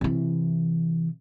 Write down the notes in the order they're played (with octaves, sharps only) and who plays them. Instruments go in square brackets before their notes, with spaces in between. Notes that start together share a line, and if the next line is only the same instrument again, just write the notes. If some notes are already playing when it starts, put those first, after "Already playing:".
[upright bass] C3 E3